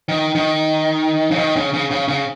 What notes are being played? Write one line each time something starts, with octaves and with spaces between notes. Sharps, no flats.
D#3
D#3
C#3
D#3
C#3
C#3
C#3
C#3